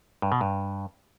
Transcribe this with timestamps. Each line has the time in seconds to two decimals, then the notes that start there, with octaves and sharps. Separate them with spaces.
0.22 G2
0.32 B2
0.41 G2